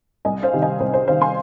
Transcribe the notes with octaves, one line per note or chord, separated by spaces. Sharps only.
C2 D#5 G#5
C5 F5
C3 D#3
D#5 G#5
C2 C5
C5
C3 D#3 C5 F5
G#5 C6